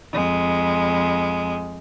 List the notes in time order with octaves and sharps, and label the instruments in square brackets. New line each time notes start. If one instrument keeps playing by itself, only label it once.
[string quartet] F2 G#3